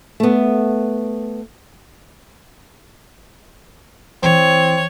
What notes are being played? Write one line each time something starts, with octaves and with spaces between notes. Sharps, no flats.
A3 B3
E3 C4 C#5